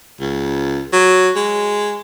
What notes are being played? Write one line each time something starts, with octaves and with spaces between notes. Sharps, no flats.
C#2
F#3
G#3